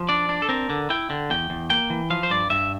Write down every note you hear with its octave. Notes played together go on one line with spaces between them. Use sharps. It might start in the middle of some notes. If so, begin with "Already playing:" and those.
Already playing: F3
D4 D5
D4
A4
C4 A#4
D3
E4 G5
D3
E2 G5
E2
A#3 G5
E3
F3 F5
C5
G2 D5
G2 E5